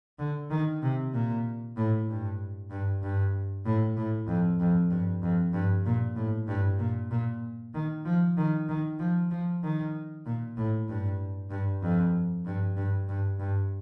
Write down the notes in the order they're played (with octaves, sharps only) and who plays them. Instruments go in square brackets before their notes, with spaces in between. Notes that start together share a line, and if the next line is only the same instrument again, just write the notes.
[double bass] D3
D#3
C3
A#2
A2
G2
G2
G2
A2
A2
F2
F2
G2
F2
G2
A#2
A2
G2
A#2
A#2
D#3
F3
D#3
D#3
F3
F3
D#3
A#2
A2
G2
G2
F2
G2
G2
G2
G2